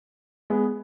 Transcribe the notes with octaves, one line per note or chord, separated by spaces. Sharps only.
G#3 B3